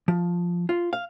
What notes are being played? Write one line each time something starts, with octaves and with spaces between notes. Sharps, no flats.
F3
F4
F5